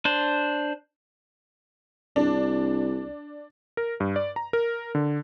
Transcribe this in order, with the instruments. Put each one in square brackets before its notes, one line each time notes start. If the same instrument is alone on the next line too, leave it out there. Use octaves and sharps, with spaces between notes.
[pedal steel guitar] D4 C5
[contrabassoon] C2 [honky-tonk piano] D4
[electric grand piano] A#4
G2
D5
A#5
A#4
D3